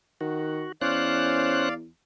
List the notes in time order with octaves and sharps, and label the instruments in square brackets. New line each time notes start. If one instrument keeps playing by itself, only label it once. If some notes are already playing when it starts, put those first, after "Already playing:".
[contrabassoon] D#3 [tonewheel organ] F#4
[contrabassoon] E2 [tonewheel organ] C#4 C5 F#6 [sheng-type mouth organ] D5 F5